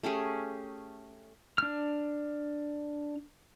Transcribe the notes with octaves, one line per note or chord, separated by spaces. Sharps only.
A3 C#4 G4 G#4
D4 F6